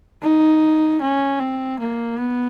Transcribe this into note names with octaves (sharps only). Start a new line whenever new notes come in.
D#4
C#4
C4
A#3
B3